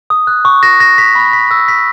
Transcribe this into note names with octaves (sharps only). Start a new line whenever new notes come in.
D#6
F#6
C#6
A#6
A#6
B6
B5
B6
E6
B6